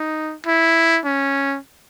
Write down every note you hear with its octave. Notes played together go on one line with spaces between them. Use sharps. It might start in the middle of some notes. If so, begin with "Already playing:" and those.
Already playing: D#4
E4
C#4